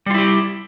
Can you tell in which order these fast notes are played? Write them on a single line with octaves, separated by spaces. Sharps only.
G3 F4 E4 G4